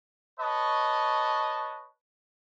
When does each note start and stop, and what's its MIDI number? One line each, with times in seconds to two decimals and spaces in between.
0.40 1.88 71
0.40 1.88 73
0.40 1.88 75
0.40 1.88 81
0.40 1.88 85